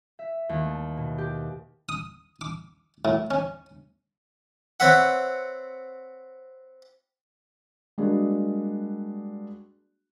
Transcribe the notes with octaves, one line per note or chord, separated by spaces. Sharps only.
E5
D#2
A3
B2
G4
D#6
D6
A2
C#4
C4 B4 C#5 E5 F#5
G3 G#3 A#3 D4 F#4 G#4